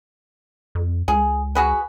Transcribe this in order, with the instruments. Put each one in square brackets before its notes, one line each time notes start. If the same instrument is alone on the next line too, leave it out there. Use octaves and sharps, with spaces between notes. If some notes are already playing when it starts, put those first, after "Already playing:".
[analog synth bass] F2
[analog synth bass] C#2 [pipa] G#4
[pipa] F#4 G#4 B4